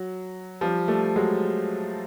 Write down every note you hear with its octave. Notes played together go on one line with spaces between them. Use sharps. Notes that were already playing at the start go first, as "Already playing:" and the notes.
Already playing: F#3
F3 G3
G3 A3
F#3 G#3